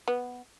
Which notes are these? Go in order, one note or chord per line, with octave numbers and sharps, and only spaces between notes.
B3